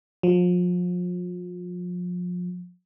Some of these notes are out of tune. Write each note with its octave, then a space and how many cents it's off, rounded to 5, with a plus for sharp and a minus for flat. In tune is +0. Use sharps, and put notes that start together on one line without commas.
F3 +35